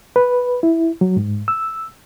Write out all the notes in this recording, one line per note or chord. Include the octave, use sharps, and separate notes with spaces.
B4
E4
F#3
G#2
E6